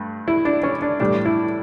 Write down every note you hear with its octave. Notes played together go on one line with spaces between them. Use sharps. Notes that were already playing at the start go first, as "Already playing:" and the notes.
Already playing: G2 A3
E4
D4
C#4
D4
A2 E3 G3 D4
E4